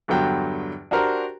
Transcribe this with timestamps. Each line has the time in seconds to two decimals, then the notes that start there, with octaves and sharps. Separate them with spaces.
0.08 E2 G2 D3 F#3 G5
0.91 D4 F#4 G4 A#4 C5